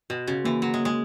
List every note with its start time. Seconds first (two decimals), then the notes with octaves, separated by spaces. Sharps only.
0.10 B2 F#4
0.27 C#3 F#4
0.44 E3 A#3
0.61 F#3 F#4
0.74 G#3
0.79 A#3
0.85 G#3